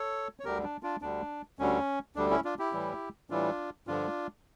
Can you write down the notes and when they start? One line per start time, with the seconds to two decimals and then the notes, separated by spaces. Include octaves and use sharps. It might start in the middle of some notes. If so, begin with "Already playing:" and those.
Already playing: A4 C#5
0.40 C#5
0.44 D2 D3 G3 G4 A#4
0.64 D4
0.83 D4 F4
1.02 D2 D3 G3 D4
1.59 D2 D3 G3 C#4
2.16 D2 D3 G3 D4
2.30 C#4 E4
2.45 D4 F4
2.59 E4 G4
2.73 A2 E3 G3
3.30 A2 E3 G3 D4 F4
3.87 G2 D3 F3 D4 F4